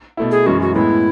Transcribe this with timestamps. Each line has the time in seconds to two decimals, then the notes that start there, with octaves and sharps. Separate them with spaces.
0.17 B2 A3 E4
0.31 G#4
0.46 F#2 E3 G#3 C#4 F#4
0.62 F#4
0.75 A2 G#3 B3 E4